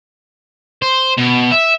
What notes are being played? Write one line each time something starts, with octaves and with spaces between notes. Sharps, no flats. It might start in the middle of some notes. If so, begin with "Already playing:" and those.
C5
B2
E5